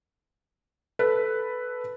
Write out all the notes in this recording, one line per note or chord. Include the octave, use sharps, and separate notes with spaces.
A4 B4